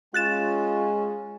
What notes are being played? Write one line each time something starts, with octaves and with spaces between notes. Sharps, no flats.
G#3 C#4 F4 F#6 A6 E7